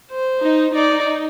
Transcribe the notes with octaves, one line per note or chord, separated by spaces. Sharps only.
C5
D#4
D#4 D5